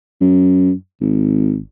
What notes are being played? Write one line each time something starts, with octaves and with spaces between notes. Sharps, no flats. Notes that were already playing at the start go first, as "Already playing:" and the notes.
F#2
G#1